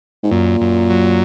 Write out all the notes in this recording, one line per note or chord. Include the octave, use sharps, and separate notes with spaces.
G#2
F#2 A#2
F#2
F#3